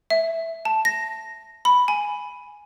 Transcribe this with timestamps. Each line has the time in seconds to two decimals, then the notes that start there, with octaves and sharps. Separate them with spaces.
0.10 E5
0.65 A5
0.85 A#6
1.65 B5
1.88 G#5